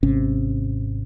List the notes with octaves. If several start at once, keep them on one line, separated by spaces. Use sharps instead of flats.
G#1 C3 C#4